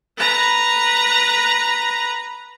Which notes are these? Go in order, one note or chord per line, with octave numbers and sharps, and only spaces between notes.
B4 A#5